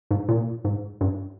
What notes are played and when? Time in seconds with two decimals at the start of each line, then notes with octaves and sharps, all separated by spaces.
0.11 G#2
0.29 A#2
0.65 G#2
1.01 G2